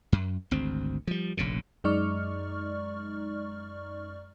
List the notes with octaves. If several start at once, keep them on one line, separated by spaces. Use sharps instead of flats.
F#2
G#1 D2 C4
F3 G3
F1 A#1 A#2 C#3
F#2 G#3 D#4 D5 C#6 F6